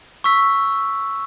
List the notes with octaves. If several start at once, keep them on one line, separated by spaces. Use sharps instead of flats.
C#6 E6 B6